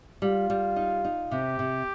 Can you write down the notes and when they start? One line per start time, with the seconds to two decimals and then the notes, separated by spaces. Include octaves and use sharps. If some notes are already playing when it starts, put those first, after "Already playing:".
0.22 G3 F4
0.50 G3
0.76 D#4
1.05 D#4
1.31 C3 G4
1.59 C3